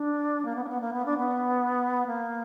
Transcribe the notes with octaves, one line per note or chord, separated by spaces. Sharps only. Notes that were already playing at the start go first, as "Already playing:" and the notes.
Already playing: D4
A#3
B3
D4
B3
A#3
B3
D4
B3
A#3